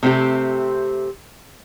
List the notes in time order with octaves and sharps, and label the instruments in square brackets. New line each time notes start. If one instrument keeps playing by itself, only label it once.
[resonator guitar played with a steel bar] C3 A3 C4 D4 G4